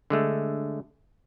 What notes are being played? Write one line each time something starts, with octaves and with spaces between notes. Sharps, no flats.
D3 G#3 A3